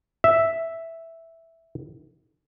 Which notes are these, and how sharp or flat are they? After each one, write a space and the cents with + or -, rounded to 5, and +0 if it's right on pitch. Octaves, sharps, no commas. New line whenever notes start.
E5 +0